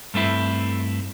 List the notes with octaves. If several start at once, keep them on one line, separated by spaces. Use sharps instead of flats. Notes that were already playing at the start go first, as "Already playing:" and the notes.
G2 A3 C4 E4